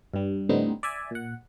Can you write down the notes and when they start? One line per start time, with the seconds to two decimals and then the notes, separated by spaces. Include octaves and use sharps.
0.14 G2 G3
0.49 A2 D3 G3 B3 C4 D#4
0.83 D5 E5 G#5
1.11 A#2 F#5